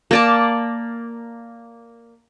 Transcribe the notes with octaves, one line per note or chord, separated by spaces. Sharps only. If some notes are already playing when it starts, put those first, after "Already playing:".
A#3 D5 A5